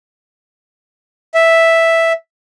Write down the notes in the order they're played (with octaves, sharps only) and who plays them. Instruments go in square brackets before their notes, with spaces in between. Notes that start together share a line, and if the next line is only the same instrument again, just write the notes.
[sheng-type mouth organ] E5